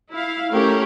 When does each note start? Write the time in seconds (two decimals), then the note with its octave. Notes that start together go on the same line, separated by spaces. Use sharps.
0.11 E4 F5
0.52 A3 C#4 G4 A#4